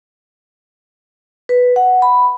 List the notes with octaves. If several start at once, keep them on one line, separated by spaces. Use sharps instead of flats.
B4
F#5
B5